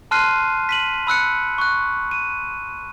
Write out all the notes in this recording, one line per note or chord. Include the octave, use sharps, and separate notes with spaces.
A5 C6 F6 F#6 C7 D#7
B6 D#7 F#7
B5 E6 F#6 C#7
C#6 F#6
D#7